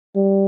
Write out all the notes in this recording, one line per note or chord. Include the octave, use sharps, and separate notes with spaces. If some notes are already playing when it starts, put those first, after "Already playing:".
G3